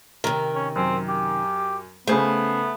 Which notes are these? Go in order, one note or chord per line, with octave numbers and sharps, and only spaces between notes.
C3 D#3 A#4
C#4
F#2 C4
G4
C#3 A3 B3 G#4 C5